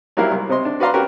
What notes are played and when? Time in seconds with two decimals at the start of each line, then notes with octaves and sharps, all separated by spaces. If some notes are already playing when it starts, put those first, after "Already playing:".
0.17 F#3 G3 A#3 E4 A#4 F5
0.31 C2
0.49 C3 C4 D#5 C6
0.65 D4
0.80 F#4 B4 D5 F5 A#5 C6
0.94 C#4 F#4 G4 A#4 B4